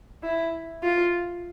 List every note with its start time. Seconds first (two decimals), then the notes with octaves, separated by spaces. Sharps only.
0.23 E4
0.83 F4